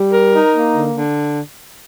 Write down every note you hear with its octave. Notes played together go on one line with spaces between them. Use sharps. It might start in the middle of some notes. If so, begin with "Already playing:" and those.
Already playing: G3
A#4
D#4
A#3
D3
D3